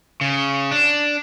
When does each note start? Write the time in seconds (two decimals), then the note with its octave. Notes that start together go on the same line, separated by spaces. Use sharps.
0.21 C#3
0.71 D4